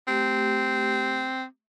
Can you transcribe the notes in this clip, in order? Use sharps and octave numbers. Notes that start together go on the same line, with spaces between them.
A3 C4 G4